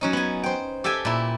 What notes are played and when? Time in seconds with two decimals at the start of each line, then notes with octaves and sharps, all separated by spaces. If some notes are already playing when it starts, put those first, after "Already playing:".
0.01 F#3 C#4 D#4
0.13 B3 G#5
0.43 C5 G5
0.84 G4 A4 E5 G5 G#5
1.05 A#2 E4